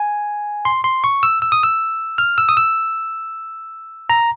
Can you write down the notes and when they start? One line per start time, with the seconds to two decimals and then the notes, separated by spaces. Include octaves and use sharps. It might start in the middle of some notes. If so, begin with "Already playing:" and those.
Already playing: G#5
0.65 C6
0.84 C6
1.04 C#6
1.23 E6
1.42 E6
1.52 D#6
1.63 E6
2.18 F6
2.38 E6
2.49 D#6
2.57 E6
4.10 A#5